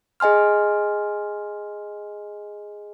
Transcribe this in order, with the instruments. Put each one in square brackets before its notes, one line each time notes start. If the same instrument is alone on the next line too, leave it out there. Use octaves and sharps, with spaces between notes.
[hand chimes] G#4 D#5 G#5 C6 F6